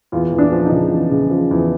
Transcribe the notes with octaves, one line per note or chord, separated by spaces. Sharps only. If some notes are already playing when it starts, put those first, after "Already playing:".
E2 F4
E2
D4
F3
D#4
C#3
E2
C#3
F3
E2